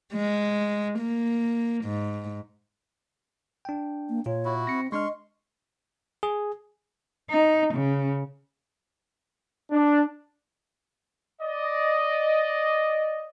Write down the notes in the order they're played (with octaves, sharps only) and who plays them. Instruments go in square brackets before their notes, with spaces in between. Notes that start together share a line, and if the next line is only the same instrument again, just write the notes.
[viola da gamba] G#3
A#3
G#2
[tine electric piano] D4 G5
[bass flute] A#3
[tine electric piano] A#2 F4 [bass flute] C#5
[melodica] E4 F#4
[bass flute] C4 [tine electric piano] A#6 C#7
[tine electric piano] G#3 D4 F6 [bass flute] D#5 [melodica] C6 C#6
[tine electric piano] G#4
[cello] D#4
C#3
[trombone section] D4
[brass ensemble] D5 D#5